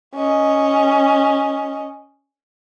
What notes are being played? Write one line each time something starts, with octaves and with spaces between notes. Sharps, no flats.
C#4 D#5